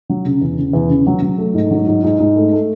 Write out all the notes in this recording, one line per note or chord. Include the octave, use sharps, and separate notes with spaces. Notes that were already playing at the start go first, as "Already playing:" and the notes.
F#3
C#3
E2
C#3
E2
C#3
F#3
F#3
A3
G#2
F#3
G#2
G#2
G#2
A3
A3